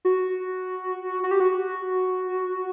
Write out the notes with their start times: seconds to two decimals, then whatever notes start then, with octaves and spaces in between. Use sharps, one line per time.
0.05 F#4
1.24 F#4
1.31 G4
1.40 F#4